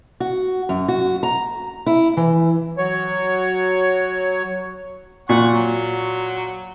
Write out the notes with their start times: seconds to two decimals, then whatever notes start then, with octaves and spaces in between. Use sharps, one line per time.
0.20 F#4
0.69 F#2
0.88 F#4
1.23 A#5
1.86 E4
2.17 E3
2.78 F#3 C#5
5.29 A#2 F#5 C#6
5.52 F#3